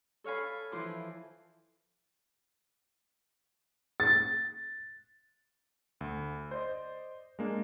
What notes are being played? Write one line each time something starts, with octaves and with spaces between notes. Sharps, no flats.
A4 C#5 F5 G#5 B5
E3 F3 E4 C5 D6
A6
D2
C5 D5 D#5
G#3 A#3 D4